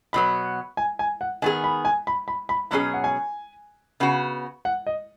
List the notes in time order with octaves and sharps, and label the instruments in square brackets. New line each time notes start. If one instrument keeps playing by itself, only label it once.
[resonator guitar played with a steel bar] B2 F#3 B3 [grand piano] B5
[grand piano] G#5
G#5
F#5
[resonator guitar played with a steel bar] D#3 B3 G#4 [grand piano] G#5
[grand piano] B5
G#5
B5
B5
B5
[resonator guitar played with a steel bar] B2 F#3 C#4 G#4 [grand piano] B5
[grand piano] F#5
G#5
[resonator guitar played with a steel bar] C#3 B3 F#4
[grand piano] F#5
D#5